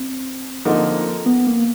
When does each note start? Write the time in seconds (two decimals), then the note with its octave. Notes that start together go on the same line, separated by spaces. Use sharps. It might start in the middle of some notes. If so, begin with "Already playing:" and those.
Already playing: C4
0.65 D3 F3 A#3 D#4
1.26 B3
1.47 A#3